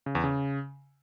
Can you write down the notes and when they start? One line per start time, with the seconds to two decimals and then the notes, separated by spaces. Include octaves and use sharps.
0.06 C#3
0.15 E2
0.24 C#3